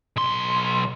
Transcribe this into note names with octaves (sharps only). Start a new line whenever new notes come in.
B1 C6